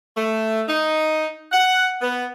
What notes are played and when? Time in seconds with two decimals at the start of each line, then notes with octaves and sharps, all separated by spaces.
0.16 A3
0.69 D#4
1.52 F#5
2.01 B3